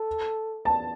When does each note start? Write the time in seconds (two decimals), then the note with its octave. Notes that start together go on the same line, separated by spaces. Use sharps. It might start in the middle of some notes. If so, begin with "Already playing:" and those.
Already playing: A4
0.65 A5